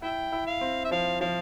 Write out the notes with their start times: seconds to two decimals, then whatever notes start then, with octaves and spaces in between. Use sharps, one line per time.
0.02 E4 E5 G5
0.32 E4
0.47 F5
0.61 C4
0.84 E5
0.91 F3 F5
1.21 F3 F5